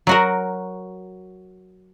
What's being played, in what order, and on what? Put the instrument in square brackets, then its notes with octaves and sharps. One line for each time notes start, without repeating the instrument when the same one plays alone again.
[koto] F#3 F#4 A#4